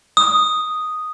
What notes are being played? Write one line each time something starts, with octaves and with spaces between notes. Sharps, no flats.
D#6